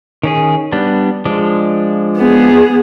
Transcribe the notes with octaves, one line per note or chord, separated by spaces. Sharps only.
D#3 C#4 G#4
G3 B3 D4
F3 G#3 D4
B3 G#4